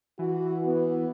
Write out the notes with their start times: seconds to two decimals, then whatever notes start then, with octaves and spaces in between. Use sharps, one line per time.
0.19 E3 F#4
0.65 B3